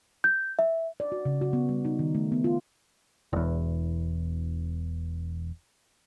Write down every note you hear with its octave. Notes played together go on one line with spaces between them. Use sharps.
G6
E5
D5
F#4
C#3
F#4
B3
G3
D#4
D#3
A3
B3
F4
E1 E2